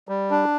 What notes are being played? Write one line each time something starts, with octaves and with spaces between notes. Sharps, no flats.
G3
D4